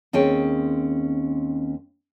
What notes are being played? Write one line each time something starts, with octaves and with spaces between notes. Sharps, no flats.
D#2 C4 C#4 G#4 G5